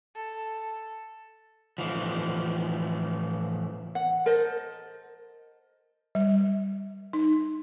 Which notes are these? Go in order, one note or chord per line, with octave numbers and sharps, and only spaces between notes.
A4
A2 E3 F3
F#5
A4 A#4 C5 D#5
G3
D#4